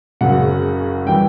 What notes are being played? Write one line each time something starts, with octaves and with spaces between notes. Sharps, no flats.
F#1 F#2 C#3 F#3 F#5
E3 G3 G5